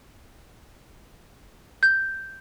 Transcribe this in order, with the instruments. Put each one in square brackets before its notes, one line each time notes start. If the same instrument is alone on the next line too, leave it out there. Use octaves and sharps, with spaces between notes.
[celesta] G6